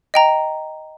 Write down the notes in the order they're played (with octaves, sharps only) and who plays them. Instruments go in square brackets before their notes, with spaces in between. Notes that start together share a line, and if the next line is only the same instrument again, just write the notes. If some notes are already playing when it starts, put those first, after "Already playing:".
[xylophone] D#5 G5 A#5